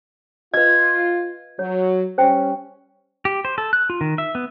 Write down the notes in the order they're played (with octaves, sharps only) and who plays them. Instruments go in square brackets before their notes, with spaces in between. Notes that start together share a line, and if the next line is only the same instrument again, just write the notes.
[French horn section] F4 [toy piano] B4 D#5 [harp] G#6
[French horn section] F#3 [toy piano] C#5
[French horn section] G3 C#4 [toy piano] C5 G5
[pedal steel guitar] G4
C5
A4
F#6
F4
D#3
E5
B3